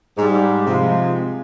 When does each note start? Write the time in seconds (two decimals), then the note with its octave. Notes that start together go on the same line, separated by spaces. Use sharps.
0.17 G#2 G3
0.66 C3 F3 G#3